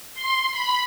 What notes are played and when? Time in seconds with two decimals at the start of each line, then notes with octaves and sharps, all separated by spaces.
0.14 C6
0.51 B5